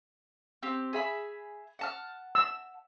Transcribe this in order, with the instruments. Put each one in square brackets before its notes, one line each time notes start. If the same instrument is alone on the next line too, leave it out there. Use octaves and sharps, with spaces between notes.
[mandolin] C4 G4
G#4 E5 B5
F#5 A5 F6
[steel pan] E6